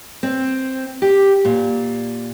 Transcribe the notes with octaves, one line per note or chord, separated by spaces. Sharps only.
C4
G4
A#2